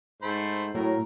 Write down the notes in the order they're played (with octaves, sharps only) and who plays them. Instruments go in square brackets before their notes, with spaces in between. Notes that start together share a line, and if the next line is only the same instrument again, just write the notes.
[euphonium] G#2 [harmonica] A3 C5 B5
[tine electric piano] A2 [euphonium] F#3 [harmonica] A#4